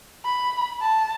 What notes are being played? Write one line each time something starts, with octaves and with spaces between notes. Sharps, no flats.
B5
A5